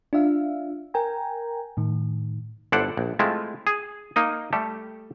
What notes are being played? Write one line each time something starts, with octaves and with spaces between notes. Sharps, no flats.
D4 F4 E5 F5
A#4 G5 G#5 A#5
A2 D#3
G1 E4 A4 C5 D5 F#5
A#1
G#3 A3 C4 E4 F4
G#4
A#3 D#4 D#5
G3 A3 G4 A4